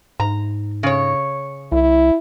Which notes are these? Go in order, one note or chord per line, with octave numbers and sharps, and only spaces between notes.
G#2 A#5
C#3 C#5
C2 E4